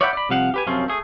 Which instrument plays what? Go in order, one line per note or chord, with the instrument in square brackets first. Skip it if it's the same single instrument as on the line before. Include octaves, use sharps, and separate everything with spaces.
[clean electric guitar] C#5 D5 E5 F#5 G5 B5
D5 B5
C2 C3 F3 F5 F#5
G4 B4 G#5
F#2 C3 F3 C4 C#4 F4
A3 G#4